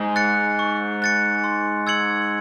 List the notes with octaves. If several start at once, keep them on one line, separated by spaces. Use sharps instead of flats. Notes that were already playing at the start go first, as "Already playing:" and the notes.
Already playing: G#2
F#6 A6 C#7
C#6
F#6 A6 C#7
C6
E6 G#6 C#7 F#7